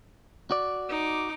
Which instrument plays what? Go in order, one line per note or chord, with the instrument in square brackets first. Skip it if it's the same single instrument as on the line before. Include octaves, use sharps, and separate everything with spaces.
[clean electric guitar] F#4 D5
[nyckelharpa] D#4 D6